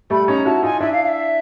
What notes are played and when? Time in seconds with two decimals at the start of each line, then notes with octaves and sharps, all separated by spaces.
0.10 G3 A3 B5
0.28 C#4 D#4 A#5
0.45 E4 F#4 A5
0.63 D#4 F4 G#5
0.80 D4 E4 E5
0.92 F5
1.03 F5
1.08 E5